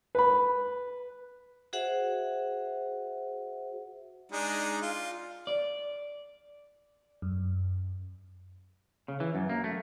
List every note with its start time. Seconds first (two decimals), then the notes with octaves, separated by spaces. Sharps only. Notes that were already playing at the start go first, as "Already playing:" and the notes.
0.15 B4 B5
1.73 F#4 G#4 C5 E5 F#5
4.32 G#3 D4 D#4
4.82 F4
5.47 D5
7.22 F#2
9.08 C#3
9.20 E3
9.35 F#2
9.50 A#3
9.64 A3